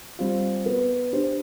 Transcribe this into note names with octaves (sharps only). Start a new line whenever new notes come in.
G3 C4 F4
B3
D4 G4 C5